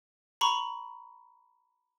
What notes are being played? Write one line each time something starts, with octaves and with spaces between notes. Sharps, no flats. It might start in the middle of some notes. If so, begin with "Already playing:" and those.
A#5 B5 C#6